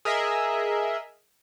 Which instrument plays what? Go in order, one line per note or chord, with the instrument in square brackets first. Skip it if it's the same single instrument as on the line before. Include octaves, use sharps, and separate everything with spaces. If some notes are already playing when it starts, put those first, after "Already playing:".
[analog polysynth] G#4 A#4 D#5 E5